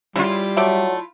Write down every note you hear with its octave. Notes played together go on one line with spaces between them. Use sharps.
C#3 G3 E4 F4
F#3 A3 D5 E5